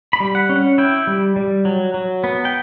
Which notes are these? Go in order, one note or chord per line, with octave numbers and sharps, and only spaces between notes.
B5
G3
F#5
C#4
F#5
E4 G5
G3
G3
F#3
F#3
B3
G5